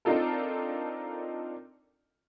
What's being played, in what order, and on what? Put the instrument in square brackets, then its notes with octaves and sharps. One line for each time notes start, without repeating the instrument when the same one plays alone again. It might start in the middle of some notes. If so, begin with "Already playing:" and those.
[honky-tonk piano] C4 D4 D#4 F4 A4 A#4